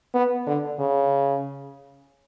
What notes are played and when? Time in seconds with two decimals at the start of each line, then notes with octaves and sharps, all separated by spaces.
0.14 B3
0.47 D3
0.79 C#3